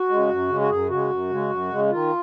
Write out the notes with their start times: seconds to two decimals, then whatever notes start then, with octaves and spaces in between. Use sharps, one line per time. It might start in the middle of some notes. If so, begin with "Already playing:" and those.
Already playing: F#4
0.09 C#3 G#3
0.29 F#2
0.49 C#3 G#3
0.61 F#4
0.69 F#2 G#4
0.89 C#3 G#3 F#4
1.10 F#2
1.30 C#3 G#3
1.50 F#2
1.71 C#3 G#3
1.90 D#3 F4